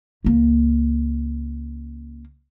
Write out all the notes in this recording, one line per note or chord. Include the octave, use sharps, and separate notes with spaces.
C#2 A#3